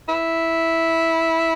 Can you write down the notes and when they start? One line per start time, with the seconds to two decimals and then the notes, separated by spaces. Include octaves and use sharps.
0.09 E4